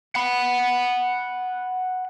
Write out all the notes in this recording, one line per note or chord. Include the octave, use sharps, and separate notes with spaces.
F#5 B5